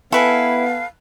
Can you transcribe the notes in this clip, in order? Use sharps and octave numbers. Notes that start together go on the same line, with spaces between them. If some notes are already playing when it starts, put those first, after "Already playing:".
B3 E4 A4 B4 F5 G#5